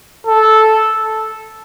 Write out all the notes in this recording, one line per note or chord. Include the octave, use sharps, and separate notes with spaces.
A4